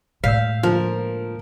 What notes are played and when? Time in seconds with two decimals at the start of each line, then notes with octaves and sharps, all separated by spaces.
0.24 A2 G#3 F5 E6 G6 B6
0.63 D3 F3 A#3 F4 A#4